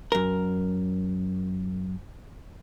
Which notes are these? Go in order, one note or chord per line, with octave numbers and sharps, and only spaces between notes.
F#2 A#4